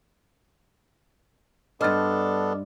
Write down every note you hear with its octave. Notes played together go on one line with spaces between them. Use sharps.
G2 B3 D4 A4 C5 D#5 F6 A6